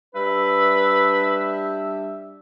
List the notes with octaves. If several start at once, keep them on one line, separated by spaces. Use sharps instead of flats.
G3 D4 B4 E5